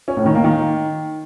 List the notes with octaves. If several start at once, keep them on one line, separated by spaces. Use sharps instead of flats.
C#4
A2
D#3
A#3
D#3